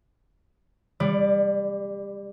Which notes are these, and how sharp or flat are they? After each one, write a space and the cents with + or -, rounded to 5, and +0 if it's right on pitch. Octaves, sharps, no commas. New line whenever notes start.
G3 +30 D5 +0